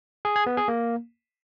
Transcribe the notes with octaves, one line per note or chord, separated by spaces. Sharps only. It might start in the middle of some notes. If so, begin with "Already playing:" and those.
G#4
G#4
B3
G#4
A#3